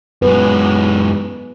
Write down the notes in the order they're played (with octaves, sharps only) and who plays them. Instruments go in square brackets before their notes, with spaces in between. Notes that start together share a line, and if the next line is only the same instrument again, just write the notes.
[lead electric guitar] F#2 G#3 [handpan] B3 B4